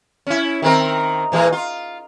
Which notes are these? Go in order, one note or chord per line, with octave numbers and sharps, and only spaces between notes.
C#4 E4
D#3 C4 A#4
A#2 E3 G#3
F4